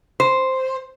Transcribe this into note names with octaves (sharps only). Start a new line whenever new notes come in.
C5